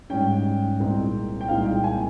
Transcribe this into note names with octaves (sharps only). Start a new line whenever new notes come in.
G#2 G3 C#4 G5
C2 A#2 G#3 C4 D#4
G5
C2 A#2 G#3 C4 D#4 F5
G5
G#5